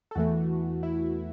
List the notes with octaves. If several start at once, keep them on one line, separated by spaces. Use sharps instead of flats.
A4
E2 E3 A3 F#4
E4